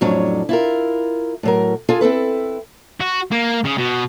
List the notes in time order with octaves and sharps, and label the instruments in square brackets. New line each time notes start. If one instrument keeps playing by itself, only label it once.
[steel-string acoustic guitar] F2 A2 F#3 C#4 D4
E4 F4 A#4
A2 F#3 A#4
F4 G#4 A4
C4 E4 A4 B4
[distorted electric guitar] F#4
A#3
C#3
B2